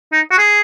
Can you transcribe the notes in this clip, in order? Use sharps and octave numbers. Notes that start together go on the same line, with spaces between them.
D#4
F#4
G#4